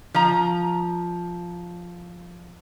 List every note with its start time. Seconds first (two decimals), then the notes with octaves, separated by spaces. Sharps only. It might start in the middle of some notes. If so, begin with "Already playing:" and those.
0.14 F3 A#5